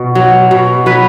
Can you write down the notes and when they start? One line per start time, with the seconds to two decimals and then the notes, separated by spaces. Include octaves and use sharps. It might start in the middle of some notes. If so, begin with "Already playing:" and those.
Already playing: B2
0.15 F#3
0.51 B2
0.86 F#3 B4